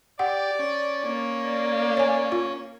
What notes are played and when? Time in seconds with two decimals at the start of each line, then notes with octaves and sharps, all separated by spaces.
0.19 G4 D5 F#5
0.59 C#4
1.05 A#3 C#4
1.45 D5
1.97 C#5 G#5
2.32 F4